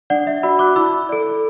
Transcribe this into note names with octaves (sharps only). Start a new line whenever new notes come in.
D4 D5 F#5
E5
F#4 D5 B5 E6
D6 F#6
E4 B5 E6
A4 D5